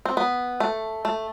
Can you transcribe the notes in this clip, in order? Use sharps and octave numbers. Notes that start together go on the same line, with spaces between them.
C4
B3
A3
A3